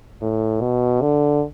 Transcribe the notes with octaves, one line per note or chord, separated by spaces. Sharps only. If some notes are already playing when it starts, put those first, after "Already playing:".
A2
B2
D3